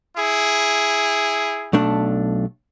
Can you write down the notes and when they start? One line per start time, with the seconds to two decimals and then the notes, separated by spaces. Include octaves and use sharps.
0.17 E4 G#4
1.73 B1 A3 D4